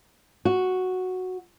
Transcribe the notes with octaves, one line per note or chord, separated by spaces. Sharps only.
F#4